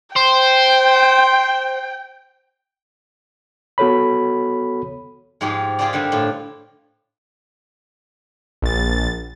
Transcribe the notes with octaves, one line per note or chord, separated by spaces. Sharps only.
C5 G5
B3 F#4 A4 C#5 B5
G#2 F3 F4 G4 G#4
F4 G4 G#4 A#4 C5 D5
G2 D3 G3 C4
A2 F4
A#1 A6